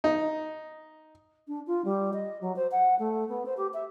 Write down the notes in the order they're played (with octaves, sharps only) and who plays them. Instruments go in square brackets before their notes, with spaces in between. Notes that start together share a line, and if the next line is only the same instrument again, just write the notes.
[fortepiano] D#4
[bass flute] D4
F4
G3
D#5
F#3
C5
F#5
A3
B3
C5
G4
E5